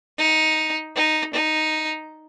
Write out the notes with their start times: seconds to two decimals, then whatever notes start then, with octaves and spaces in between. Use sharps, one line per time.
0.18 D#4
0.96 D#4
1.34 D#4